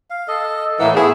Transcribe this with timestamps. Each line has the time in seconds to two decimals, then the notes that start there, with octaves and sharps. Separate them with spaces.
0.10 F5
0.28 A4 D#5
0.80 A2 E3 A#3 F#5 E6
0.95 A3 B3 E4 G#4